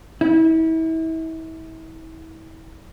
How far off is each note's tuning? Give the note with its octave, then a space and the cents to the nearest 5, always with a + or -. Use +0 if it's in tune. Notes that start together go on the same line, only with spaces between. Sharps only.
E4 -35